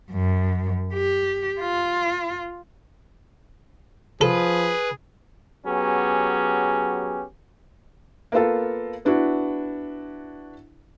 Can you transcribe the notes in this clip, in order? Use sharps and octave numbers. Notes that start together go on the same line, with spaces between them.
F#2
G4
F4
F3 G#4 A4 B4
F#3 B3 C#4 G4 G#4
A#3 B3 F4 A4
B3 D4 E4 F#4